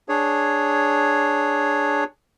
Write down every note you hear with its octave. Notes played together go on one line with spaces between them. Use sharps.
D4 G#4 C#5